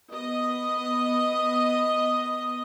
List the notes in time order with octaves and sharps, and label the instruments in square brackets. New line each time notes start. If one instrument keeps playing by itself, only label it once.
[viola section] B3 D#5